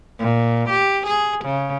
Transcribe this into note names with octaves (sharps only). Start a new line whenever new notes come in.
A#2
G4
G#4
C#3